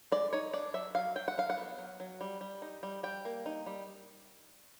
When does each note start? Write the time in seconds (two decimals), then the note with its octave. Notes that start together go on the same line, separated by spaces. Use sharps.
0.12 G#3 D5
0.33 D#4 C#5
0.53 D4 D5
0.74 F#3 E5
0.95 F#3 F5
1.16 F#3 G5
1.28 F#5
1.38 F#3 F5
1.50 F#5
1.57 B3
1.78 F#3
2.00 F#3
2.21 G3
2.41 G3
2.62 D#4
2.83 G3
3.03 G3 G5
3.25 A#3
3.46 D#4
3.66 G3